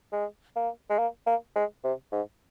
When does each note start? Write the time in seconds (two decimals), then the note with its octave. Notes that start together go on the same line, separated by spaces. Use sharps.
0.13 G#3
0.56 A#3
0.90 G#3
0.99 A#3
1.27 A#3
1.56 G#3
1.84 C3
2.13 G#2